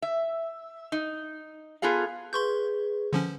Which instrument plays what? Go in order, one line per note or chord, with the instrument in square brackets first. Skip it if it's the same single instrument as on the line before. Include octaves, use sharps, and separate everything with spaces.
[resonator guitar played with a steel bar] E5
D#4
B3 F4 G#4 A4 F5
[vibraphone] G#4 B4 [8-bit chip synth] C6 C#6 G6
[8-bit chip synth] D3 F3 C#4